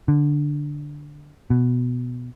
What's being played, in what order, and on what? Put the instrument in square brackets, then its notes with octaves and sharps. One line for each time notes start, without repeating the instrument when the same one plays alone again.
[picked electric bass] D3
B2